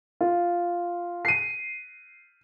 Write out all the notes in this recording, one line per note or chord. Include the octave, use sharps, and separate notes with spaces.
F4
C7 D#7